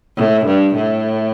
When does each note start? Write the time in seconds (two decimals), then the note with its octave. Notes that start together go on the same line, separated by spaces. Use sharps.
0.17 A2
0.46 G2
0.76 A2